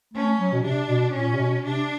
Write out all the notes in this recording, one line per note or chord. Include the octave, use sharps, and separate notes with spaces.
A3 C#4
F#3
B2
C3 D4
B2
A#2 C#4
C3
B2
C3 D4